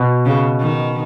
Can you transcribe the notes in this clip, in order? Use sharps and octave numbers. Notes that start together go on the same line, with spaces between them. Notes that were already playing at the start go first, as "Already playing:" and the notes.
Already playing: B2
C#3
D#3